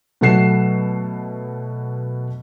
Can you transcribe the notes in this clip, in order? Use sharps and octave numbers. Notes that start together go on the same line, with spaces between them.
B2 F#3 A3 F#5 C7 E7